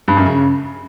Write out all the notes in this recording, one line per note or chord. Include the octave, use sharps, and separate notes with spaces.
G2
F#2
C#3